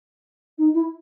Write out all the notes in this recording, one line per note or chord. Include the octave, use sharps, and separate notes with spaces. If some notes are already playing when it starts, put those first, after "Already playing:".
D#4
E4